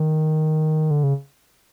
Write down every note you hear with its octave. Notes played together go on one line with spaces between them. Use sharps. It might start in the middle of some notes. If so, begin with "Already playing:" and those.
Already playing: D#3
D3
C#3